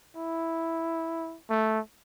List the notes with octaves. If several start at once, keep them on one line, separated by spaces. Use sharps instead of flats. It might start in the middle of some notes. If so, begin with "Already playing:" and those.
E4
A3